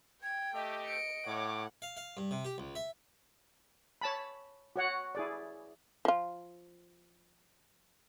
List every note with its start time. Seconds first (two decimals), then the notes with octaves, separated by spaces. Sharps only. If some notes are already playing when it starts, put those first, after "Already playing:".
0.23 G5 G#6
0.55 A3 G4 D#5
0.86 C#7 D7
1.27 A2 C#5 F#5 D6
1.82 F5
1.97 F5
2.17 G2
2.31 C3
2.45 G4
2.58 C#2
2.75 E5
4.01 C#5 A5 B5
4.76 F#4 C#5 F#5
5.15 E4 G#4 D5
6.05 F3 F4